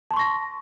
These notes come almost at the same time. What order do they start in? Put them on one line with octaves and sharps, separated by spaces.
A5 C6 C#6 A#6